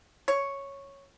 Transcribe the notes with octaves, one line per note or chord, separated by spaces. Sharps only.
C#5